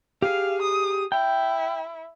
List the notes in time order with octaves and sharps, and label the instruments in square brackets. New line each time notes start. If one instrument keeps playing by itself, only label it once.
[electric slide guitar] G4 G#4 [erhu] F5
[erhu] D#6
[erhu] E4 [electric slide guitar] G5